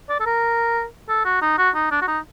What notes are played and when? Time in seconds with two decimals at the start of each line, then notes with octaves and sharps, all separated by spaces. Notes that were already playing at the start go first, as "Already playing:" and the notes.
0.09 D5
0.20 A4
0.26 A#4
1.09 A4
1.25 F#4
1.42 D#4
1.58 F#4
1.75 D#4
1.91 D4
2.01 F#4
2.07 D#4